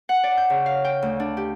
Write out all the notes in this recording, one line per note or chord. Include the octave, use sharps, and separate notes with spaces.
F#5
D5
G6
C#3
F5
G5
D2
D4
G4